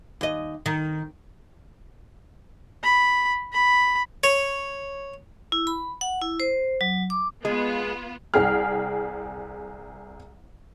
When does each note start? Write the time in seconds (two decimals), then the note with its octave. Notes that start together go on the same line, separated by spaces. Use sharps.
0.21 D#2 D#5
0.66 D#3
2.83 B5
3.52 B5
4.24 C#5
5.52 E4
5.67 B5
6.01 F#5
6.21 E4
6.40 C5
6.81 F#3
7.10 D6
7.45 G#3 B3 F4
8.34 C2 G#4 G5 F6